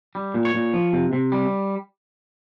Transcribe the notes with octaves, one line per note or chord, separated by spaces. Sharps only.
G3
A#2
C#5
A#2
F3
C3
C3
G3